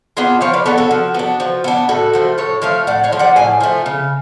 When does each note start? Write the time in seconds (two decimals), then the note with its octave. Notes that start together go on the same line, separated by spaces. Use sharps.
0.17 B3 D4 F4 G#4
0.41 F3 C#5 F5
0.53 B4 D5
0.66 B3 D4 A4 C#5
0.77 F#4 A4
0.91 F3
1.14 B3 D4
1.40 F3
1.64 B3 D4
1.89 A2 F#4 A4
2.13 F3 A3
2.38 A2 A4 C#5
2.62 F3 A3 C#5 F5
2.87 A2 D5 F#5
3.04 C#5 F5
3.12 F3 A3
3.19 D5 F#5
3.36 A2 F5 G#5
3.60 F3 A3
3.86 C#3